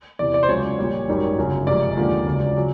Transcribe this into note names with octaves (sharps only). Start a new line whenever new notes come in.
E2 C3 E3 D5
D5
C5
C#2 C#3 F#3 C#5
A#1 A#2 G3
G#1 F#2 D#3 G3
G1 F#2 C#3
F1 F2 C3 F3 G#3 D5
D#2 D3 F3 G#3
C#2 C#3 F#3
C#3 F#3